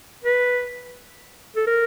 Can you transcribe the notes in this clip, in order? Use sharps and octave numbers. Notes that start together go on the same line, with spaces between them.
B4
A4
A#4